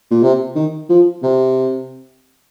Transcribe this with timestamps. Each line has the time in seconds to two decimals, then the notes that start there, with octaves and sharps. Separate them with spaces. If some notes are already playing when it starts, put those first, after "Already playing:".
0.11 A#2
0.23 C3
0.55 D#3
0.89 F3
1.23 C3